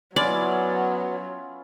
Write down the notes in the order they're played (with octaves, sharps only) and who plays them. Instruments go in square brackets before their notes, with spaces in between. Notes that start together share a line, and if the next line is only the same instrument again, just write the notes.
[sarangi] F#3 [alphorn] B3 [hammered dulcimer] C#4 E4 F4 [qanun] D5